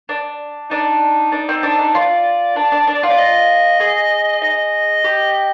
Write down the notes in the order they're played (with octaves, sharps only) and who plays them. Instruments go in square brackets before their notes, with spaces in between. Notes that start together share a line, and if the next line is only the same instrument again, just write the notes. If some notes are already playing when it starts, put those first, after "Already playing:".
[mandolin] D4
[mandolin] D4 [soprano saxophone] D#4
[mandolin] D4
C4
D4
D4
[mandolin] F4 [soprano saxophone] D5
[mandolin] D4
D4
D4
F4
[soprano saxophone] D5
D#5
[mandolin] G#4
[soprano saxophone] D#5
[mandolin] G4